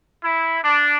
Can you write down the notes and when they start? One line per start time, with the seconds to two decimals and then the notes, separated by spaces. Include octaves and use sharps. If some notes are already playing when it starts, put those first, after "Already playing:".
0.25 E4
0.64 D4